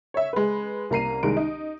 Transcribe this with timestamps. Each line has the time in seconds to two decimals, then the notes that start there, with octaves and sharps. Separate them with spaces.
0.14 C#5 E5
0.33 G#3 B4
0.90 C2 A#3 A#5 C7 D#7
1.23 C2 D#3 G#3 A#5 D7
1.37 D#4